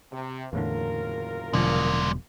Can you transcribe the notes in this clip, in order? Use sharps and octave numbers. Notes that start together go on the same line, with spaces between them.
C3
F#1 E2 A2 D3 F4 A#4
E1 B2 D3 F3 F#3 G#3 D5